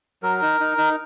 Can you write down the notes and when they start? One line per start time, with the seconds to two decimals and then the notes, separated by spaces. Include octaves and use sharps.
0.22 F#3 A#4
0.42 D#4
0.60 D#4
0.78 D#4